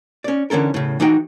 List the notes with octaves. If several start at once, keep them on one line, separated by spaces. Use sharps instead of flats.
C#4 D5
D3 E3 C#4 A4 A#4
A2 C#3
E3 D#4 F#4 G5